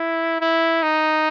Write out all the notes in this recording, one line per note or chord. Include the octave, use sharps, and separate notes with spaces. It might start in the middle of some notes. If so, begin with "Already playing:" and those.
Already playing: E4
E4
D#4